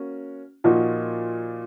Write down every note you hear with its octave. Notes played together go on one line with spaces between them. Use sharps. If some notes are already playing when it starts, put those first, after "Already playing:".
Already playing: A#3 C#4 F#4
A#2 F3 A#3 D#4 F#4